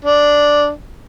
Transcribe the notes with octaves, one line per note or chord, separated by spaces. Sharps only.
D4